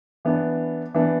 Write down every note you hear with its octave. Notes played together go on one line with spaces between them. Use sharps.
E3 B3 D4
E3 B3 D4